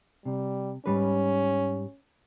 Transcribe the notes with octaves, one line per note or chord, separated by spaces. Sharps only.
C3 G3
G#2 G3 C#4 B4